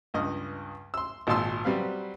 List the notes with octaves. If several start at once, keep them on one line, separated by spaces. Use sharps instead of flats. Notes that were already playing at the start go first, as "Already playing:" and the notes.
C#2 G2 D#5
C6 E6
G#1 A#2 D#4 A5 C6 E6
F#3 G3 C4 B4 F5